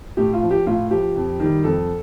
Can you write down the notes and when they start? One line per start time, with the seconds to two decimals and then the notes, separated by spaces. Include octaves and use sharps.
0.17 A2 G4
0.33 F4
0.43 F3
0.51 G4
0.66 A2 F4
0.91 F3 G4
1.16 F2
1.40 D#3 G3
1.64 F2 A4